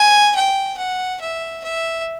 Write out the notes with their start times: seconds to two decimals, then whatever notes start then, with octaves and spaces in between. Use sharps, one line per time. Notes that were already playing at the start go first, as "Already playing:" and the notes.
Already playing: G#5
0.36 G5
0.78 F#5
1.21 E5
1.64 E5